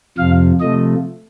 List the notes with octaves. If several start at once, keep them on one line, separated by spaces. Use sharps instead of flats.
F2 C3 F3 F5
C3 F3 A3 D#5